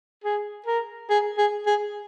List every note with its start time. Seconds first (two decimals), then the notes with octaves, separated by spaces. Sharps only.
0.24 G#4
0.66 A#4
1.10 G#4
1.38 G#4
1.67 G#4